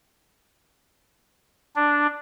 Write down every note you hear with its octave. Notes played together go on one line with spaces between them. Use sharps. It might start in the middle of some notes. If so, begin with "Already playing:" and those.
D4